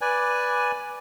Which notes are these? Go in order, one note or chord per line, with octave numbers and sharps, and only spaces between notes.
B4 D5 G#5